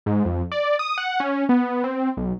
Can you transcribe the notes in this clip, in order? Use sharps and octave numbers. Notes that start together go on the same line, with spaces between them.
G#2
F2
D5
D#6
F#5
C#4
B3
C4
B1